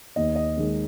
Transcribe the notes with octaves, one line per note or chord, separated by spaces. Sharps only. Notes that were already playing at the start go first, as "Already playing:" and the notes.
D#2 D#5
D#5
D#3 G#3